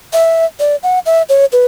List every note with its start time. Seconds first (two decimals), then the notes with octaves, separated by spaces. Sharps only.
0.13 E5
0.60 D5
0.83 F#5
1.06 E5
1.29 C#5
1.52 B4